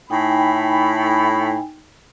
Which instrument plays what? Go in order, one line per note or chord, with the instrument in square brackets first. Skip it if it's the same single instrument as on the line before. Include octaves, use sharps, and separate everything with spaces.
[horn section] A2 B5 [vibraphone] D#4 G5 G#5